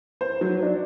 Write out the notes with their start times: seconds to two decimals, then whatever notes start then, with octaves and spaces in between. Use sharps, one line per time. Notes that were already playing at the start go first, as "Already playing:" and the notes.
0.21 C5
0.41 F#3
0.62 D4